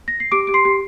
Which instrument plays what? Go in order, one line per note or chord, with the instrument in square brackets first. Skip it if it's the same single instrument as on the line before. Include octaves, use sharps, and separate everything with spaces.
[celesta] A#6
C7
G4 D6 D7
G4 D7
C6 C7
G4